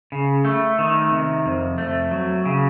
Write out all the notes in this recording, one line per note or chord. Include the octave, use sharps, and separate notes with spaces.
C#3
A3
D#3
C3
F2
A3
F#3
C#3